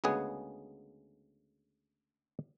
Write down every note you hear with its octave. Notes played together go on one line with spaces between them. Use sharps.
D2 C#3 G#3 B3 G#4 F#5